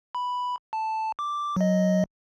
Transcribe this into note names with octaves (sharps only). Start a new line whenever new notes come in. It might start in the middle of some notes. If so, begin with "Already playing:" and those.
B5
A5
D6
F#3 D#5